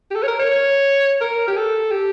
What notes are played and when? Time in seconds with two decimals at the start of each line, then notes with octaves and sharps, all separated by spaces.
0.11 G4
0.15 A4
0.23 C#5
0.28 A#4
0.39 C#5
1.21 A#4
1.48 G4
1.57 A4
1.91 G4